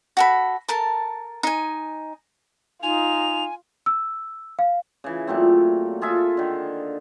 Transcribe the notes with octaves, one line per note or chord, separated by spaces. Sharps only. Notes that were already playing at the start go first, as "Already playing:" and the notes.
F#4 A4 B5
A4 A#4 A5
D#4 G#5
D#4 F4 G#5 F7
E6
F5
C#3 E3
A#2 F#3 A3 C4
F4 G#4 A4 E5
D3 D#3